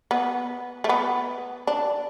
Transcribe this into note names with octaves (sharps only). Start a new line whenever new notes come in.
B3
A3
B3
D4